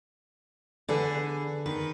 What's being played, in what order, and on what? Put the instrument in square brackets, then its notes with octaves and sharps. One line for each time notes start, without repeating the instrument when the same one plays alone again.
[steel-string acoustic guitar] D3 G#4 [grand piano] A4 B4 D5
[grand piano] D#3 [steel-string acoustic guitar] B4